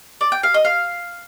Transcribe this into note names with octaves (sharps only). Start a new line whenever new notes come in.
D5
G5
F5
D#5
F5